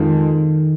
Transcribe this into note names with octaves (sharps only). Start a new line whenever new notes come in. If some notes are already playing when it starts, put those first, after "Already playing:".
Already playing: F2 D#3 F3 G#3